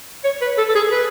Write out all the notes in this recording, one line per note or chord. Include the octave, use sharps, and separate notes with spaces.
C#5
B4
A4
A4
G#4
B4